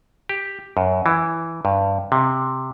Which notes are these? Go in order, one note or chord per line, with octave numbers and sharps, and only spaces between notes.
G4
F#2
E3
G2
C3